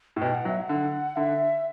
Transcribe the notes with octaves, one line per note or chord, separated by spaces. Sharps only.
A2
B2 G5
F#5
F#3
E5
F#5
D3
D3 E5